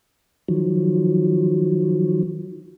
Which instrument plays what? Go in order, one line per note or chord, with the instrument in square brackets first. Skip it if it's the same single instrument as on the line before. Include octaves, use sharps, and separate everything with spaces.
[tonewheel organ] D#3 F3 F#3